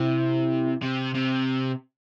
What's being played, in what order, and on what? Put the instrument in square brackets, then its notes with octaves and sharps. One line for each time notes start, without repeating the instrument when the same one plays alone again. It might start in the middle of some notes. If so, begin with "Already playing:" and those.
Already playing: [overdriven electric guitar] C3 [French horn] E4
[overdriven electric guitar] C3
C3